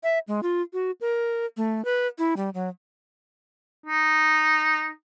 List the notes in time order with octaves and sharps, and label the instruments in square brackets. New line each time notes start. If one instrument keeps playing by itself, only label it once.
[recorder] E5
G#3
F4
F#4
A#4
A3
B4
E4
G3
F#3
[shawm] D#4